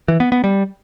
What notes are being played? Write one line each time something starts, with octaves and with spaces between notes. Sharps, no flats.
E3
B3
B3
G3